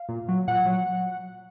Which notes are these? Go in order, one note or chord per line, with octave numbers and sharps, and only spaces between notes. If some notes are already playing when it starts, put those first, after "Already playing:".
Already playing: F5
A#2
F#3
A#2 F#5
F#3